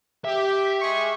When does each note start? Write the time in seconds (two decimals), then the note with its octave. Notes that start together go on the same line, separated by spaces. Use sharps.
0.25 G4 E5
0.81 G#3 G#4 C#6